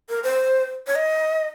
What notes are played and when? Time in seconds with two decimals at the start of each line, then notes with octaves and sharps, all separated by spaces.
0.09 A#4
0.23 C5
0.87 C#5
0.95 D#5